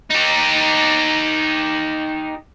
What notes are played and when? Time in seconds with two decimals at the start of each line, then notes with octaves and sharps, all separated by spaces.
0.11 D#4 G4